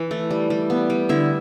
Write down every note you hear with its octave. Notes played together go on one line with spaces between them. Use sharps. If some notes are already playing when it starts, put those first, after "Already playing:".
Already playing: E3
A3
G3
G3
B3
G3
D3 E4 E5